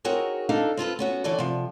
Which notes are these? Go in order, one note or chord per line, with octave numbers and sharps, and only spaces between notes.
C4 D#4 F#4 G#4 A#4 C#5
F2 D4 D#4 A4 F5
C4 F4 A4 B4
B3 C#4 F#4
D3 E3 A4 C#5 D5 G#5
C3 F3